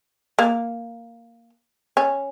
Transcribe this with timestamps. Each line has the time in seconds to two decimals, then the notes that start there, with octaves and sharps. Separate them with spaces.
0.39 A#3
1.97 C#4